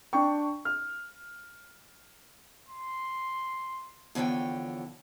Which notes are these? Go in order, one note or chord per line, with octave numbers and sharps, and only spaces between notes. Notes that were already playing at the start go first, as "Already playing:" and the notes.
D4 G5 C#6
F6
C6
E2 D3 F3 C#5 G5